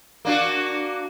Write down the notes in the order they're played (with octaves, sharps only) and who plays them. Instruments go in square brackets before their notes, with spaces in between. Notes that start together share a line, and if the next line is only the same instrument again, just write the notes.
[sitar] A#3 D4 F#4